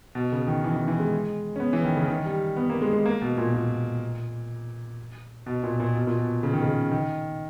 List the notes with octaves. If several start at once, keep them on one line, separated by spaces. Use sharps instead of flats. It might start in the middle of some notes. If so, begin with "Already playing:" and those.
B2
C#3
D#3
E3
E3
E3
G#3
C#4
B3
E3
D#3
C#3
D#3
G3
B3
A#3
G#3
G#3
A#3
B2
A#2
A#2
B2
A#2
A#2
B2
A#2
B2
C#3
D#3
C#3
D#3